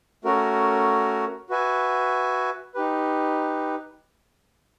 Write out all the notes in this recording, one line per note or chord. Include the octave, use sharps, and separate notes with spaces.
A3 C#4 F#4 A#4
F#4 B4 E5 G#5
D#4 G4 B4